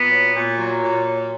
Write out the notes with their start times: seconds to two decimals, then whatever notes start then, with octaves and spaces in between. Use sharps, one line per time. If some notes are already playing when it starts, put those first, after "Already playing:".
Already playing: A#2 B3
0.10 F#3
0.34 A#2
0.58 F#3
0.82 A#2
1.06 F#3